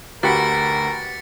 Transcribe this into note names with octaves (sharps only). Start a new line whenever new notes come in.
D2 F#4 G4 A#4 B4 A6 B6 C#7